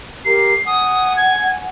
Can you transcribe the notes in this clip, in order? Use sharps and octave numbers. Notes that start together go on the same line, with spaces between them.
G4 A#4 A#5 C7
F#5 G#5 D#6
G#6